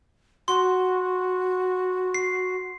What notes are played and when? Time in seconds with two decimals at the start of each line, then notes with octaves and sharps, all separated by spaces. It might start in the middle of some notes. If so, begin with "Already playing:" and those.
0.48 F#4 C6
2.14 C7